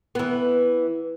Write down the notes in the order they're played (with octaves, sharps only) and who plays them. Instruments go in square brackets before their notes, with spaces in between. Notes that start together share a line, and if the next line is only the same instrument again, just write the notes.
[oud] E3 B3